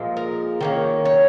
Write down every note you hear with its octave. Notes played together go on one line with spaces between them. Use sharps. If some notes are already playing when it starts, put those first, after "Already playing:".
Already playing: A#2 F3 G#3
A#4
D#3 A#3 C#4
C#5